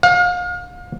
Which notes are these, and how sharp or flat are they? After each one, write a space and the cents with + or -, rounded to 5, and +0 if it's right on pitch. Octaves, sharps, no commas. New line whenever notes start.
F5 +35